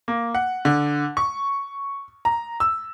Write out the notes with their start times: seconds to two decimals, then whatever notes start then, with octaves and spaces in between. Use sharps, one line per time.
0.08 A#3
0.35 F#5
0.65 D3
1.17 C#6
2.25 A#5
2.60 E6